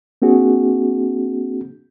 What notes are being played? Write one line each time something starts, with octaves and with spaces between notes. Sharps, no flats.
A#3 C4 D4 F#4 G#4